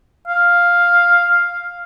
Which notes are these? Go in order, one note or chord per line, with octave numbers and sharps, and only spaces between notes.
F5